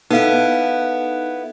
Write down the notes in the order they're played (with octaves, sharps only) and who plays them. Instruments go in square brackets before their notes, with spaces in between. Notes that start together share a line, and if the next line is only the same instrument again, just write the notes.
[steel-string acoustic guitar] B3 E4 [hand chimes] D#4 A4 F5